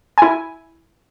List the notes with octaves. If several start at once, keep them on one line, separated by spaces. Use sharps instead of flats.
E4 G#5